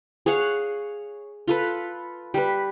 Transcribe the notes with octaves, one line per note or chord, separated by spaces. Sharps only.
G#4 C#5 F5 F#5
F4 A4 B4
G3 B4